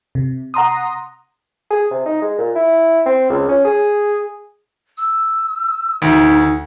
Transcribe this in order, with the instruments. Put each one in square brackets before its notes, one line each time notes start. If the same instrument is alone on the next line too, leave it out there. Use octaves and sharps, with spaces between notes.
[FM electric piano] C3
F#5 A#5 C6 D#6
[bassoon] G#4
C3
D#4
G#3
A#2
E4
C4
C#2
C#4
G#4
[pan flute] E6
[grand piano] D2 [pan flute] D#4